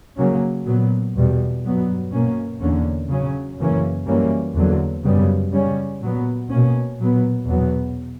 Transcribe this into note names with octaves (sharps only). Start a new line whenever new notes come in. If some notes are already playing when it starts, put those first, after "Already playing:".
C#3 F#3 A#3 C#4
A#2 F#3 B3
E2 B2 G3
G2 F#3 B3
B2 A#3 C#4
E2 D3 A#3 C#4
C#3 F#3 C#4
F#2 C#3 E3 A#3 C#4
F#2 E3 G3 A#3 C#4
E2 D3 F#3 A#3
F#2 C#3 G3 B3
C#3 G3 C#4
A#2 F#3 B3
B2 A#3 C#4
A#2 F#3 B3
E2 B2 F#3 B3